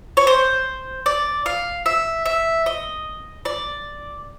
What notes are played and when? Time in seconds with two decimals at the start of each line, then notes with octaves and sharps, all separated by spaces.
0.17 C#5
0.27 C5
1.06 D5
1.46 F5
1.86 E5
2.26 E5
2.66 D#5
3.45 D5